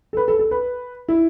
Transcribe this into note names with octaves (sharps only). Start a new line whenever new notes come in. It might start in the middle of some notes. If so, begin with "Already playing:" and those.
A4
B4
A4
A4
B4
E4